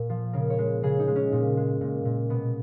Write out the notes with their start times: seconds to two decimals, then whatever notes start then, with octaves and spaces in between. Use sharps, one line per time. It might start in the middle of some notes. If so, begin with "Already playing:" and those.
Already playing: A#2 A#4
0.10 F3
0.33 C#3 A#4
0.50 C#5
0.58 G#3
0.83 C#3 G#4
0.99 D#4
1.08 G#3
1.16 C#4
1.32 A#2 D#4
1.57 G#3
1.81 A#2
2.05 A#2
2.30 B2 B3